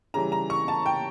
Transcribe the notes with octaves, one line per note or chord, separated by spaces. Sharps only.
C#3 E3 G3 A#5
A#5
C#6
A5
G5